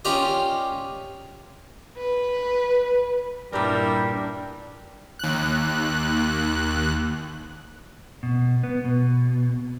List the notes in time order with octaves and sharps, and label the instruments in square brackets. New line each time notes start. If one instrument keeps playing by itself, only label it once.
[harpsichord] C#4 F4 G4 A#4 D5 D#5
[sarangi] B4
[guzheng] G2 A#2 [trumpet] G3 [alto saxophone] D4 [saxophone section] E4 G4 A#4
[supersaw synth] D#2 F#6
[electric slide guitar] B2
B3
B2